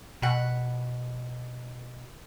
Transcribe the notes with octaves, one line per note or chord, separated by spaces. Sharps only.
B2 F#5 B5